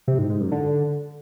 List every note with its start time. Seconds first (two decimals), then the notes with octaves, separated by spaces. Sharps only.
0.08 C3
0.19 G#2
0.30 G#2
0.41 F#2
0.52 D3